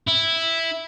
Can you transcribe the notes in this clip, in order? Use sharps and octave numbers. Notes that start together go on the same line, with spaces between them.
E4